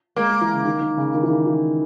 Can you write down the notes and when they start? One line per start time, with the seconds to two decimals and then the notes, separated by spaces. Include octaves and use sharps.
0.16 G#3 A#3
0.30 G#3
0.41 E3
0.54 C#3
0.65 D#3
0.81 D#3
0.97 C#3
1.15 D#3
1.23 E3
1.30 D#3
1.47 E3